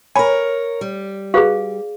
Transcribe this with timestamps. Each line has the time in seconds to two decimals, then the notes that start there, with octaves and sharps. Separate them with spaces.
0.16 A#4 C#5 G#5 B5
0.81 G3
1.34 F#4 G#4 B4 F5